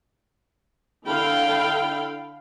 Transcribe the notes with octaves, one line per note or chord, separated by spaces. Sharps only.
D3 E4 A4 F5 G5 B5